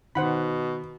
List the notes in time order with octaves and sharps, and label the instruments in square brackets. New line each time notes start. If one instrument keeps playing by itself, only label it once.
[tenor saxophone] B2 [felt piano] D#3 [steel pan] C5 F#5 B5